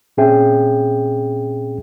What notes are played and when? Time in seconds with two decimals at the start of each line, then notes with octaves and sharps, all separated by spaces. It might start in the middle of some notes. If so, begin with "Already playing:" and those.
0.17 A#2 C4 C#4 G#4 E5 G5